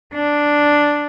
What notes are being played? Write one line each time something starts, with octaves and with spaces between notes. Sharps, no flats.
D4